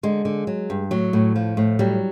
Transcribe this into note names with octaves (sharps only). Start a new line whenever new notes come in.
D3 G#3
D3
F#3
G2
A2 F#3
A2
F3
A2
F#3 G3